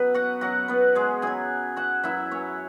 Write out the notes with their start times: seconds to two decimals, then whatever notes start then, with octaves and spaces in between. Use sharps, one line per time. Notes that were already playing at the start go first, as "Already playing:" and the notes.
Already playing: F#2 F#3 B3 B4
0.14 F#4 F#5
0.41 F#2 F#3 F#4 F#5
0.68 B3 B4
0.95 G#3 G#4
1.22 F#2 F#3 G#4 G#5
1.76 F#4 F#5
2.03 F#2 F#3 E4 E5
2.31 C#4 C#5